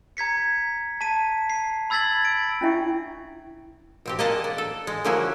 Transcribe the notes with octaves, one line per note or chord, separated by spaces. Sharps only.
A#5 G#6 B6 C#7
A5 B6 D#7
C7
B5 E6 G#6 A6 B6 F#7
D7
C#4 D4 E4 E5 G5 C#6
B2 C4 G4
A#3 G#4 D#5 F#5 A5
D5
A4
G#3
D3 F3 A#3 C#4 E4 F#4